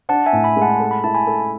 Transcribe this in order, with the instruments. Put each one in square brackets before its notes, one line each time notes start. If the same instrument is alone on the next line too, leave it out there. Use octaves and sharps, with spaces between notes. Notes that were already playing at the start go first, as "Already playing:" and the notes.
[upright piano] D4 [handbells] F#5 A5
[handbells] E5 G#5
[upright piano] A2
[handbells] G#5 B5
[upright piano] G#3
[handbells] F#5 A5
[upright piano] A4
[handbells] B5
[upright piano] E4 [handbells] A5
[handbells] G#5 B5
[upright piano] A4